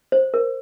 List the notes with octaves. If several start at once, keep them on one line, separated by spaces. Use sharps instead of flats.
C5
A#4